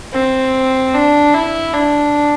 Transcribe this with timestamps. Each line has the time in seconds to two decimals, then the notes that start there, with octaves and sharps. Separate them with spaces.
0.13 C4
0.94 D4
1.34 E4
1.74 D4